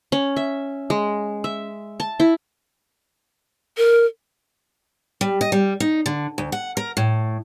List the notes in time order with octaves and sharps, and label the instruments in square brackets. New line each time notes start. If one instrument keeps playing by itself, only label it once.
[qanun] C#4
E5
G#3
E5
A5
E4
[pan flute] A#4
[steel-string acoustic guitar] G3
D#5
G3
D#4
D3
D2
F#5
A#4
A2